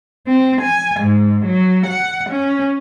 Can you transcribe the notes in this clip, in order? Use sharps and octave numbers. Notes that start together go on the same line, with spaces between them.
C4
G#5
G#2
F#3
F#5
C#4